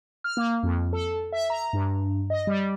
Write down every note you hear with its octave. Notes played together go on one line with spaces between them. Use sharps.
F6
A#3
F2
A4
E5
A#5
G2
D#5
G3